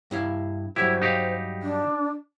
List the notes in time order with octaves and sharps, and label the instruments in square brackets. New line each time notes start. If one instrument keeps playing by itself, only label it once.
[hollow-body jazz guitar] G2 E4 F5
[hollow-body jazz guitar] G2 F#3 G3 [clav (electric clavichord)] E4 G4 [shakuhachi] C5
[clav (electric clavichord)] D#4 G4 F5
[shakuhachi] D4